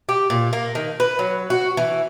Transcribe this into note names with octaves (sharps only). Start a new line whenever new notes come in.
G4
A#2
A#3
D#3
B4
F#3
F#4
E3